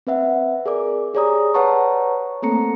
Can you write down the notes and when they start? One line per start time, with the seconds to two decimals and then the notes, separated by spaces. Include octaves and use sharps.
0.07 C4 B4 E5 F#5
0.66 G#4 A#4 D5 D6
1.14 G4 G#4 C#5 D5 A#5 D#6
1.54 B4 C#5 F#5 A5 A#5 C#6
2.42 A3 A#3 C4 A4 A#5 C#7